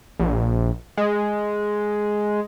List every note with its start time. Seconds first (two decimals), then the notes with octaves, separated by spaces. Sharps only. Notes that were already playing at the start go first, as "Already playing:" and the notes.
0.20 A#1
0.97 G#3